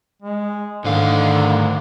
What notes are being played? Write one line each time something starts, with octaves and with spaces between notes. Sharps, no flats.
G#3
D2 G#2 D3 D#3 F5